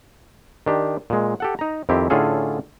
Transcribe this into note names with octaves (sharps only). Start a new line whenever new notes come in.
D#3 D4 G4
A#2 G#3
G4 A4 F#5
D#4 A#5
F2 D#3 C4 E4 G4
A2 D3 C#4 F4 G#4 A4